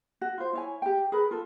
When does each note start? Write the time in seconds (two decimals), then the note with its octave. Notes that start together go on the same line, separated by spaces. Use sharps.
0.21 F#4
0.38 F4 C5
0.53 E4 C#5 G#5
0.82 G4 G5
1.12 G#4 A#4 B4
1.31 F4 A4